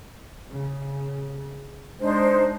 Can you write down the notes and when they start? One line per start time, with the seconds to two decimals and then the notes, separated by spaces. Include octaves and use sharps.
0.50 C#3
2.00 G#3 D4 D#4 C5